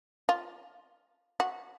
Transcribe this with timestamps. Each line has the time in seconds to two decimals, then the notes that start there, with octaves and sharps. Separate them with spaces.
0.29 F4
1.40 F#4